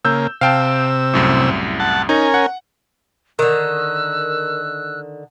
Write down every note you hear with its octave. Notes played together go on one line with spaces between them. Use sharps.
C#3 A#3 E6 G6
C3 F5 G5 A5 E6
C2 F#2 A2
F#5 A5
C#4 D#4 A#4 G#5
F#5
D3 D#3 A#4 E6 F#6